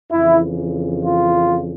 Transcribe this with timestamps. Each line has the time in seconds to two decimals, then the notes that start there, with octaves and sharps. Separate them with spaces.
0.12 F2 C#3 E3 E4
1.05 F4